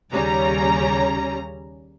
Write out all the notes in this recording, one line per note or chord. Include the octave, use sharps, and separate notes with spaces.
D#2 C#3 G3 C#4 A#5